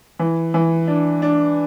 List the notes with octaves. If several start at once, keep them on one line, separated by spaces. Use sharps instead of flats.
E3
E3
D4
D4